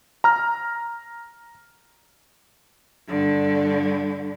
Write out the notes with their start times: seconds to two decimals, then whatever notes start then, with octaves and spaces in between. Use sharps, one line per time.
0.24 A#5 F6
3.07 G2 D3